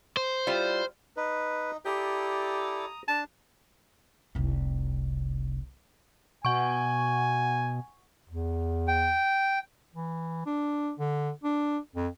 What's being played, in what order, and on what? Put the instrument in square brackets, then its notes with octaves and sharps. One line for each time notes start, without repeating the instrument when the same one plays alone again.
[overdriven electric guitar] C5
[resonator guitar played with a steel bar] G3 E4 F4
[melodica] D#4 [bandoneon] B4
[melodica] E4 A4 D5 [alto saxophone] G4 [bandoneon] A#5 D#6
[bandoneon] D4 [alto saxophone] A5
[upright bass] F1 C2
[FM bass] B2 [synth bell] F#5 C#6 [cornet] G#5
[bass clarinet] E2
[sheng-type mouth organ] G5
[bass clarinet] E3
D4
D3
D4
F2